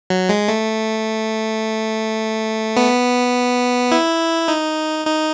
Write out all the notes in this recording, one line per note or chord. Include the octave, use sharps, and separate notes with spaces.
F#3
G#3
A3
B3
E4
D#4
D#4